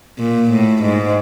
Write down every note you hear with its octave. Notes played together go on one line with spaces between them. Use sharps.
A#2
A2
G#2